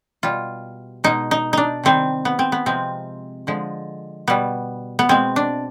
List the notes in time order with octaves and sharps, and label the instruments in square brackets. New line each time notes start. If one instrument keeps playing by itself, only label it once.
[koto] B2 G3 F4
B2 G#3 D#4
D#4
D4 D#4
C3 D#3 G3 C4
B3
C4
B3
C3 F3 G#3 C4
D3 F3 G#3
B2 G3 B3
B3
B2 G#3 C4
D4